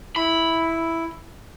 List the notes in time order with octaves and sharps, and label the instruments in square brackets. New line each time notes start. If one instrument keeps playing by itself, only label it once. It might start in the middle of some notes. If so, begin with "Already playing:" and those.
[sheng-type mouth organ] E4 [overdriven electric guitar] B5